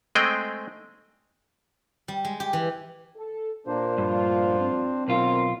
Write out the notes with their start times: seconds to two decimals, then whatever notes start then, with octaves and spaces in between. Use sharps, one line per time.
0.15 G#3 A3 C4 G#4 D#5 G5
2.08 G3
2.25 G#3
2.40 G4
2.53 E3
3.17 A4
3.67 A#2 A#3 D4 C5
3.98 D2 G2 F3 F4
4.60 C4
5.08 B1 B2 D#3 F4 A#4